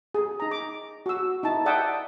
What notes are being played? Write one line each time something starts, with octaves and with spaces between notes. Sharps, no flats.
G#4
D#4 A#5
D6
F#4 E6
D#4 E4 A5
D5 E5 F#5 G5 A5 D#6